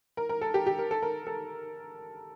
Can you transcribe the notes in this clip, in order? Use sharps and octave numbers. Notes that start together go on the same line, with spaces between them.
A#4
A#4
A4
G4
G4
A#4
A4
A#4
A4